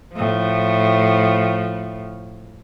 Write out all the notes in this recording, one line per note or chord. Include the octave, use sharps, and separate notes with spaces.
A2 F3